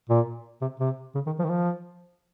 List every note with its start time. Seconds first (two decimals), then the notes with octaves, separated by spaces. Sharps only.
0.09 A#2
0.61 C3
0.80 C3
1.15 C#3
1.26 D#3
1.39 F3
1.45 D#3
1.50 F3